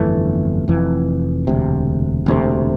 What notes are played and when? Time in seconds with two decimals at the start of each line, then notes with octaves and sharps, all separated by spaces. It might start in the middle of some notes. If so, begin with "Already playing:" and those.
Already playing: G1 F2 E3 A3
0.68 F1 F2 E3
1.47 E1 D2 C3
2.26 E1 D2 C3